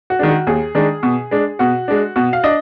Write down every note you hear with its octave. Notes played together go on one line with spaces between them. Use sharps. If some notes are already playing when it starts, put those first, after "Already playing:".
F#4
D#3 G#3 D4
F#4
D#2 G#4
D#3 G#3 D4
B2
G#3 D4
B2 F#4
G#3 D4
B2 F#4
F5
D4 D#5